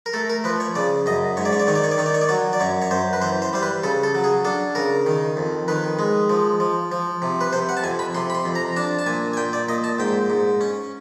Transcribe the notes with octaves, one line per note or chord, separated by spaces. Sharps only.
A#4
A3 A4
A#4
F3 B4
C#5
C#3 D5
F#2 D#5
G#2 C#5
D5
C#5
D5
D#3 C#5
D5
C#5
D5
D#3 C#5
D5
C#5
D5
F#3 C#5
D5
F#2 C#5
C#5
F#2 C5
B4
E3 C5
C5
G3 C5
B4
C#3 A4
A4
F#3
G#4
D4 A4
C#3 A#4
D#3
F2
D#3 B4
G#3
F3
F3
F3
C3
B4
C3 C5
F#5
A5
F2 G#5
B5
C3 C6
B5
C6
F2
A#5
D4 A5
A5
A#2 G#5
G#5
A#2 G5
D5
A#2 D#5
A5
G#2 G5
G#2
C#4